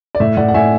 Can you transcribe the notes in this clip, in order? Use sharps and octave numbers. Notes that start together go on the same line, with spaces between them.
D5
A2 E5
A2 D5 F#5
F#5
A2 E5 G#5